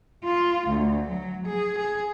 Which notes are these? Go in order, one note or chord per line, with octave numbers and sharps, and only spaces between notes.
F4
D2
F#3
G#4
G#4